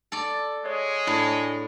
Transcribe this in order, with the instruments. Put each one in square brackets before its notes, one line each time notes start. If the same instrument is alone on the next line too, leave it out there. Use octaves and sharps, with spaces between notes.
[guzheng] A4 D5
[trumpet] G#3 [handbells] C#5
[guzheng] A2 [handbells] D4